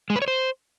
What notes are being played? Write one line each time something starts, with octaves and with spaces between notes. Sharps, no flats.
G#3
B4
C#5
C5